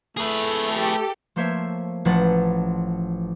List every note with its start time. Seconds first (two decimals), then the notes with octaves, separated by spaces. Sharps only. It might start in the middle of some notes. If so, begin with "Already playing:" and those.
0.17 A3 G#4 B4
0.70 G4 A4
1.36 F3 A3 A#3 C5 C#5 E5
2.05 A1 F3 A3 B4 F#5 A6